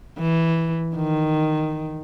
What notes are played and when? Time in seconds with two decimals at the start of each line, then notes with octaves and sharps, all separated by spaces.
0.19 E3
0.96 D#3